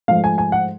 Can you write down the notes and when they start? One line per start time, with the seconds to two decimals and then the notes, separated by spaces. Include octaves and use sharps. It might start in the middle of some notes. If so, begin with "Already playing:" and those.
0.08 G#2 F3 A3 F5
0.24 G#5
0.38 G#5
0.52 F#5